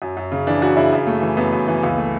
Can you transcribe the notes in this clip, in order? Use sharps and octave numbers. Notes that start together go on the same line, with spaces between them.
F#2
F#2
C#3
E3 D4
F#2 F#4
C#3 E4
F#2
A3
E3
F#2 B3
F#2
E3
C#2
A3